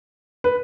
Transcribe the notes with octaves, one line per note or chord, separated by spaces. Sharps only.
B4